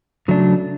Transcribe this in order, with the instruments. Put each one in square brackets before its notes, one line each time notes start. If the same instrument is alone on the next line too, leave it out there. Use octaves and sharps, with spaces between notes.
[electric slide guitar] C#3 F#3 A3 D4